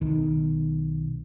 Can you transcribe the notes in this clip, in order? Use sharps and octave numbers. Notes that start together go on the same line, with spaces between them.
B1 D#3